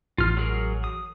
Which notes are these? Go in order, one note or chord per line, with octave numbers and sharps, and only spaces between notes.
A1 F4 F6
F#3 G#4 A#4
D#6